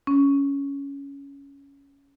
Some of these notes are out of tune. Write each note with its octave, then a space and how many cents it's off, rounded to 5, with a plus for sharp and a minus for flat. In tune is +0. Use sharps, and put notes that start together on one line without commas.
C#4 +10